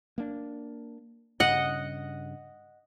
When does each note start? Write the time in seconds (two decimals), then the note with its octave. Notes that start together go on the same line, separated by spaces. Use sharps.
0.18 A#3 D4
1.40 G2 C#3 D#5 F#5